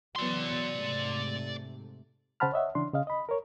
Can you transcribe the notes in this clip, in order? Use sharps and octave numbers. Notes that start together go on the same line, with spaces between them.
E3 F#3 B3 D5 C6
G#2 C3 A3
C#3 C5 F#5 A5 B5 F6
C#5 D#5 E5 F#5
C#3 E3 D4 C6
C#3 D#5 F5
D#5 B5
A#4 C#5